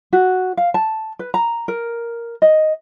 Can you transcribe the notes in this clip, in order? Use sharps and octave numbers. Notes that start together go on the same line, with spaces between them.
F#4
F5
A5
B4
A#5
A#4
D#5